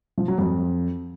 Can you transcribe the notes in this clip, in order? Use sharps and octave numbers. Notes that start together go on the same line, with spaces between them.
F3
F#3
F2